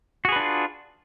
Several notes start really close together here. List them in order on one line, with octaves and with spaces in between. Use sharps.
F#4 G#4 B4 D4 F4